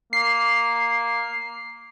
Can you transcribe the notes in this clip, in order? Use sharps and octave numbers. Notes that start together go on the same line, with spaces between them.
A#3 C7